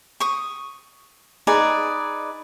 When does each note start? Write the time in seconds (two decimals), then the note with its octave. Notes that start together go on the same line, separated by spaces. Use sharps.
0.20 C#6 D#6
1.47 D#4 G#4 B4 D5